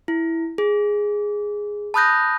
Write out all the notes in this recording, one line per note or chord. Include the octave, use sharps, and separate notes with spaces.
E4
G#4
A5 B5 D#6 F#6 G6 A#6